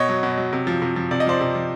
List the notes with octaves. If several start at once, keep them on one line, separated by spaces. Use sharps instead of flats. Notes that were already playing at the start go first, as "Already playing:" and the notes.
Already playing: B2 C#5 D#5
F#3
B2
F#3
C3
F3
C3
F3
C3 D5
D#5
F3 C5 D5
C3
F3